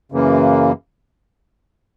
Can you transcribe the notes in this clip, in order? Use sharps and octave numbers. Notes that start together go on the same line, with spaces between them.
F#2 C#3 E3 A#3